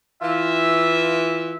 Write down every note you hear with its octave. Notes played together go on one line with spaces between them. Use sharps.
E3 F4 E5